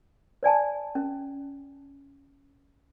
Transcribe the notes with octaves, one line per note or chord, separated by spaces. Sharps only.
C5 D5 G#5 A5
C#4